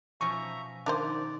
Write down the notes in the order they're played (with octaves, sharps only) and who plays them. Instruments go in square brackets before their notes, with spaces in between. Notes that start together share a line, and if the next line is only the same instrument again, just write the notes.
[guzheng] B2 F3 C#4 [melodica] E5 A#5 [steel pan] C#6
[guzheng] D#3 [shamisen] D4 A#4 C5 [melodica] D5